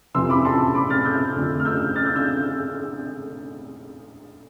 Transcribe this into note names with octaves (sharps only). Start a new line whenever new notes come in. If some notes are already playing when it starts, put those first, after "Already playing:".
F2 C3 E3 C6 E6
B5 D6
A5 C6
B5 D6
F6 A6
E6 G6
F2 D3 A3
F6
E6 G6
F6 A6
E6 G6
E6 G6